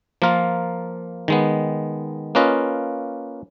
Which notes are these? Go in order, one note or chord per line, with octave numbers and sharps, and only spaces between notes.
F3 A#3 F4 A#4
D#3 G#3 B3
A#3 C#4 F4 B4 D#5